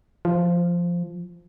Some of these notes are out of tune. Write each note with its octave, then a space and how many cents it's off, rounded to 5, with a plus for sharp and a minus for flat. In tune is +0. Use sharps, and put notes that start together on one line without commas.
F3 -5